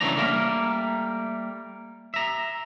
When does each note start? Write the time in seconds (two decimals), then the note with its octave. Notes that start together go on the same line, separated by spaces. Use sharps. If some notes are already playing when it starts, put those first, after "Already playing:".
0.01 C#3 E3 F#3 A3 D4 A#5
0.17 G3 A3 A#3 A#4
2.14 E5 A#5